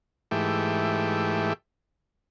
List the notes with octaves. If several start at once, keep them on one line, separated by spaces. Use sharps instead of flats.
G#2 E3 A3 G4